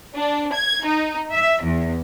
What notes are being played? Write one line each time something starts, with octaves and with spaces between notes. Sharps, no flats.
D4
G#6
D#4
E5
E2